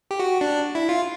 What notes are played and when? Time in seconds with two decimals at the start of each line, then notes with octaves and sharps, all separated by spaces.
0.11 G4
0.20 F#4
0.41 D4
0.75 E4
0.89 F4